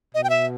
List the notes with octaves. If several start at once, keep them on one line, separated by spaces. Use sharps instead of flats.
B2 D#5
G5
E5